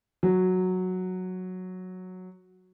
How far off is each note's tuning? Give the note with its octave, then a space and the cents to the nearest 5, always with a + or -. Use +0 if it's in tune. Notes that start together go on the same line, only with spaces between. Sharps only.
F#3 -5